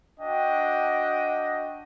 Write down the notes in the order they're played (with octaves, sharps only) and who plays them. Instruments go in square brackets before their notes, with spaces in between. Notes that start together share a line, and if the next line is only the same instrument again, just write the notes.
[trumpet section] D4 F#4 D#5 G5